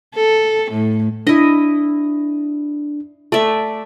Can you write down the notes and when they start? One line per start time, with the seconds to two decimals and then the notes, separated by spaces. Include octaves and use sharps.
0.15 A4
0.71 A2
1.27 D4 E4 D#5
3.32 A3 D5 E5